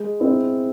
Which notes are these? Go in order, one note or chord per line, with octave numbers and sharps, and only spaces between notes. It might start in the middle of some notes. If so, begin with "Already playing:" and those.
Already playing: G#3
C4 E4